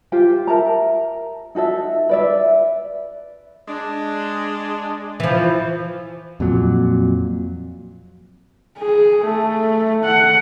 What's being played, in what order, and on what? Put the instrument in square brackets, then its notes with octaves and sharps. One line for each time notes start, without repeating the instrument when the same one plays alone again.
[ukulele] F4 G4 C5
A#4 E5 A5 A#5
D#4 F#4 A4 E5
B4 D5 E5
[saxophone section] G#3 D4
[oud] E3 F3
[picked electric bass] F2 A#2 F#3
[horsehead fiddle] G#4
A3
F#5